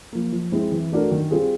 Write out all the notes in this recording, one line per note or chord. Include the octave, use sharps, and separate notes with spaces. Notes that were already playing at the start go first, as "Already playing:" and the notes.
F3 A#3
F3
G#3 C4 E4
E3
A3 D4 F#4 A#4
D#3
G3 C4 F4 G#4